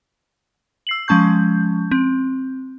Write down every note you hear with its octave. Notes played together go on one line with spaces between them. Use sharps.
E6 C7 F#7
F3 G#3 C#4 A5 C#6 G6
C4